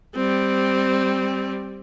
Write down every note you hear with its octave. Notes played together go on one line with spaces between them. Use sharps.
G3 C4